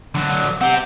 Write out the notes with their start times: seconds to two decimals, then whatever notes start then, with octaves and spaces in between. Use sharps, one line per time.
0.15 D3 F#3
0.61 C4 G4 F#5